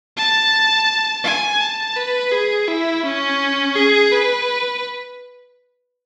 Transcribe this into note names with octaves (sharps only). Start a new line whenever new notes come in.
A5
G#5
A5
B4
G#4
E4
C#4
G#4
B4